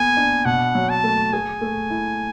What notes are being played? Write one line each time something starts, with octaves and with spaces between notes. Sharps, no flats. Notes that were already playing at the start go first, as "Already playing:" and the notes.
Already playing: B3 A4 G#5
D4
B2 F#5
F#3
A5
A3
G#4 G#5
A3
E4